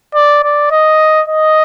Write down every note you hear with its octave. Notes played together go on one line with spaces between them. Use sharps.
D5
D5
D#5
D#5